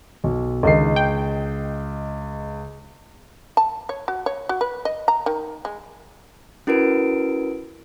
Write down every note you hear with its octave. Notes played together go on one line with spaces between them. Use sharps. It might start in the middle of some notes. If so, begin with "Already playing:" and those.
B1
C#2 D3 D#3 D#5 C7
G5
A5
C#5
F#4
C#5
F#4
B4
D#5
A#5
D#3
G#3
C#4 E4 F#4 A#4 B4 D7